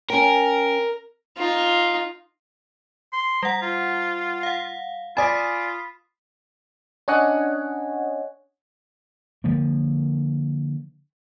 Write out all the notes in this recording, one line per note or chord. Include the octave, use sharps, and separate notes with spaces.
C#4 A#4 G5
D#4 F4
C6
G3 F#5 A#5
F4
F5 F#5
F4 D5 G#5 B5 D#6 B6
C#4 D4 C#5 D#5 F#5 G#5
D3 F3 A#3